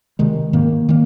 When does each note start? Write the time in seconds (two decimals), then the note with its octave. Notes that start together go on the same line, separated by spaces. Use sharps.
0.19 C3 D#3 G#3
0.53 G#2 D#3 A#3
0.89 D#3 A#3